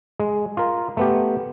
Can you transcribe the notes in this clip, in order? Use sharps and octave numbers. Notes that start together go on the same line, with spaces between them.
G#3
F4 A#4
A3 B3 G4